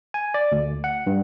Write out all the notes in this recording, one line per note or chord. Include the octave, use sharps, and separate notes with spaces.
G#5
D5
D2
F#5
G2